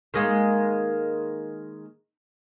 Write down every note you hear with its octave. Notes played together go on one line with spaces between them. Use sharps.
D#3 G#3 A#3